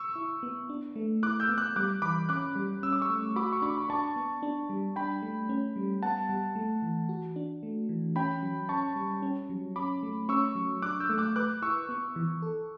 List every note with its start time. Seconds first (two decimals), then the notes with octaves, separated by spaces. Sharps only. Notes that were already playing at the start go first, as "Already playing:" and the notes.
Already playing: C#6 E6
0.16 E4
0.43 B3
0.69 D4
0.96 A3
1.23 E4 D6 F#6
1.40 E6 G6
1.49 B3
1.58 D6 F#6
1.76 G3 D6 F#6
2.02 E3 B5 D6
2.29 C#4 D6 F#6
2.56 G3
2.83 C#4 E6
2.93 D6
3.02 C#6 E6
3.09 A3
3.36 F#4 B5 D6
3.53 C#6
3.62 D4 B5 D6
3.78 B5
3.89 D4 A5 C#6
4.16 B3
4.43 D4
4.69 G3
4.96 D4 G5 B5
5.22 A3
5.49 C#4
5.76 G3
6.03 B3 F#5 A5
6.29 G3
6.56 A3
6.82 E3
7.09 F#4
7.36 D4
7.63 A3
7.89 E3
8.16 C#4 G5 B5
8.43 F#3
8.69 C#4 A5 C#6
8.96 G3
9.22 C#4
9.50 F#3
9.76 C#4 B5 D6
10.03 A3
10.29 C#4 C#6 E6
10.55 F#3
10.82 D4 D6 F#6
11.00 E6 G6
11.10 A3
11.18 D6 F#6
11.36 B4 D6 F#6
11.62 E4 C#6 E6
11.89 B3
12.16 E3
12.42 A4